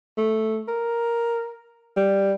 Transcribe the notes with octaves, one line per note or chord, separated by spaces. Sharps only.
A3
A#4
G3